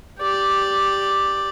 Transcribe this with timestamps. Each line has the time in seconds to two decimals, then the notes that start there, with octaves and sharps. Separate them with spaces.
0.20 G4 D5